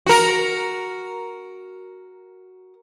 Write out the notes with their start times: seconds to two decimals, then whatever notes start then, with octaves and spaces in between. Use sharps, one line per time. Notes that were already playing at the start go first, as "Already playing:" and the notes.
0.07 F#4 A#4